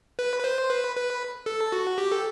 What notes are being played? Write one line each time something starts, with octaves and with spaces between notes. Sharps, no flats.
B4
B4
C5
B4
B4
A4
F#4
G4
A4